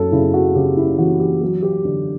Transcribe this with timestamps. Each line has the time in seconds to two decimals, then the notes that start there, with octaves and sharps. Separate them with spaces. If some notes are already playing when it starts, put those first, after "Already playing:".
Already playing: F#2 A4
0.12 C#3 E4
0.34 F#4
0.55 C#3 G4
0.77 E4
0.98 E3 F#4
1.20 G4
1.41 F#3 G4
1.63 G4
1.85 D3